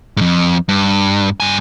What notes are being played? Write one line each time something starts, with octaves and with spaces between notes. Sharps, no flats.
F2 G#2
G2
G2 G#5